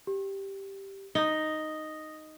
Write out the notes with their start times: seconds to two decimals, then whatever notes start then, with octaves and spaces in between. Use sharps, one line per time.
0.07 G4
1.15 D#4 D#6 A#6 G7